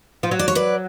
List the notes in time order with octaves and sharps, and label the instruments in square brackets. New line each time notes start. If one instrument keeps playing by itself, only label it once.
[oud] F3
F#3
[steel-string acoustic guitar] D5
C#5
B4 D5